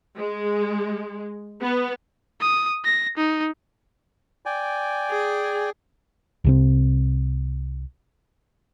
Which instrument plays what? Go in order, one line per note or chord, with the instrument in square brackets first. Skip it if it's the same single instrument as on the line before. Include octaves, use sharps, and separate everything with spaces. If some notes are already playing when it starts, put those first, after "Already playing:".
[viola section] G#3
B3
[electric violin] D#6
A#6
D#4
[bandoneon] D5 G5 G#5
[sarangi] G#4
[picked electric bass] C2 C3 C4